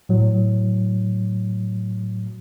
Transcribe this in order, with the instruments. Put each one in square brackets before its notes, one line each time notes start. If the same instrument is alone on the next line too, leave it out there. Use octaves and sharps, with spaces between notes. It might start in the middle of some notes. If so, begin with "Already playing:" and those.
[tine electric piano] A2 F#3